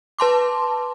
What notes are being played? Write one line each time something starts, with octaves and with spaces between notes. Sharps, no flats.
B4 A5 C6 D6